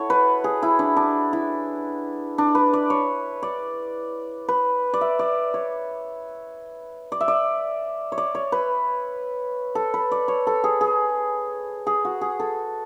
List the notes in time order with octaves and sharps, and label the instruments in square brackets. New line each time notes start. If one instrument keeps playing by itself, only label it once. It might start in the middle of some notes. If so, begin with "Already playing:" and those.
Already playing: [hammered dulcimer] E4 F#4 A4 C#5
B4
G#4
E4
D4
D4
E4
D4
B4
D5
C#5
D5
B4
D5
E5
D5
C#5
D5
E5
D5
C#5
D5
C#5
B4
A4
B4
D5
C#5
A4
G#4
G#4
G#4
F#4
G#4
A4